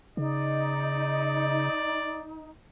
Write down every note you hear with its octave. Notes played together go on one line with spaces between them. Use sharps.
C#3 D#4 D5